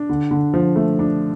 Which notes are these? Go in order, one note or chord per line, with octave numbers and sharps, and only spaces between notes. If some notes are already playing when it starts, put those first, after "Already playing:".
Already playing: D4
D3
D3
F3
A3
D4